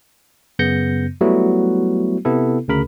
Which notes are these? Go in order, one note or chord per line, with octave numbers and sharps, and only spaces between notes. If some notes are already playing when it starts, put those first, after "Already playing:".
F#2 C#3 B3 G6 A#6 C#7
F#3 G3 A3 B3 E4 F#4
C3 B3 E4 A4
D2 C#3 A#4 B5